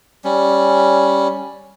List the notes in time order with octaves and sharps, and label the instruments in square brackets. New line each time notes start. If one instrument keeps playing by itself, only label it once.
[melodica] G3 C#4